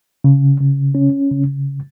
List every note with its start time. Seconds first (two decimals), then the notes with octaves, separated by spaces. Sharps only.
0.24 C#3
0.60 C#3
0.95 C#4
1.31 C#3